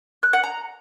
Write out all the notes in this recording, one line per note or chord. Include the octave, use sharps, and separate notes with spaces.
F#6
F#5
A#5